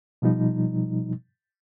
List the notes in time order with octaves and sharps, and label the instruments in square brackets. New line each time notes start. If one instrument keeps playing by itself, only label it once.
[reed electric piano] B2 F3 G3 D#4